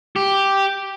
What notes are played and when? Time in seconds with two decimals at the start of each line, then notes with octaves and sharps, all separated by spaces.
0.16 G4